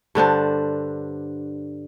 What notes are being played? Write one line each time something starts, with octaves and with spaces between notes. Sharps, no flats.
G2 D3 D4 C5